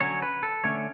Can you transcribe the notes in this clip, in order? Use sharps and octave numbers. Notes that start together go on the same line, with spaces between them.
D3 F#3 C#4 C#5
B4
A4
D3 A3 C#4 C#5